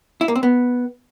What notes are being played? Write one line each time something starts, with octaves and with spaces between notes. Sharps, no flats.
E4
A#3
C4
B3